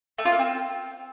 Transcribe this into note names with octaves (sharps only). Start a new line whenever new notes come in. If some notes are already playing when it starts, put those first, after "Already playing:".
A3
F4
A#3
C4